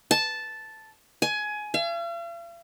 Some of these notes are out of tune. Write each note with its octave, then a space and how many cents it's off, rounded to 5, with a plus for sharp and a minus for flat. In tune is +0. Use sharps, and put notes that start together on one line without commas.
A5 -5
G#5 +20
F5 -45